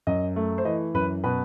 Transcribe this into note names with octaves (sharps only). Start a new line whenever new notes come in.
F#2 D#5
A3
C5
E3 D#5
F#2 B4
B2 B4